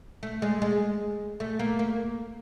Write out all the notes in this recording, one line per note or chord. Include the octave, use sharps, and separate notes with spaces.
A3
G#3
G#3
A3
A#3
A#3